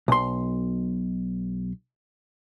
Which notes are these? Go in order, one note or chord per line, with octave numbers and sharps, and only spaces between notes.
B1 C6